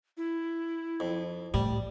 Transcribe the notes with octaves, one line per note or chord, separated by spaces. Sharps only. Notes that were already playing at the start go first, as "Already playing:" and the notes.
E4
F2
A2 G3